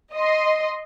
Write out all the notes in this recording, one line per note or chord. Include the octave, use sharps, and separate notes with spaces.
D#5 C6